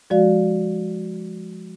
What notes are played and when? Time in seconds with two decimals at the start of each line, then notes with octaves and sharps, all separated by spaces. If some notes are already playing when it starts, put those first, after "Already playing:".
0.10 F3 G#3 F#4 D5 F5